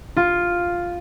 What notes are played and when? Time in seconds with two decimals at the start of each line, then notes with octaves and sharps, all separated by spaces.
0.17 F4